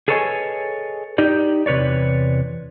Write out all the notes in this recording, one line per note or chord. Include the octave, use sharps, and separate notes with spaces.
G#4 A4 B4 C#5 D#5 G#5
D#4 G4 D5
E2 C3 B4 C#5 D5